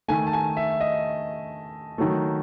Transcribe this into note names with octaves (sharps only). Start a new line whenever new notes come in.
D#3 A3 G#5
A5
G#5
E5
D#5
D#3 F#3 A3